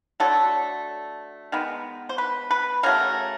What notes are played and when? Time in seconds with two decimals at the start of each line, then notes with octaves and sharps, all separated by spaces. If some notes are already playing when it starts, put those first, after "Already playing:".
0.20 D3 F#3 A3 A4
1.52 D#3 G#3 B3
2.09 C5
2.18 B4
2.51 B4
2.83 C#3 F#3 A3 A#4